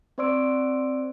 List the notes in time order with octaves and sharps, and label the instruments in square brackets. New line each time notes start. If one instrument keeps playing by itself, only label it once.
[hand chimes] C4 C5 D5 C6 E6 D7